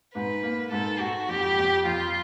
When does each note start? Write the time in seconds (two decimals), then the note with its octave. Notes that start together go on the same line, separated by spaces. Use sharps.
0.15 G#2 B4
0.43 A#3
0.72 G#2 A4
1.00 G#2 F#4
1.29 F2 G4
1.58 F2
1.86 F2 F4